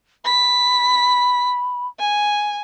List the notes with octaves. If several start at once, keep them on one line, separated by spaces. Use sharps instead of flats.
B5 B6
G#5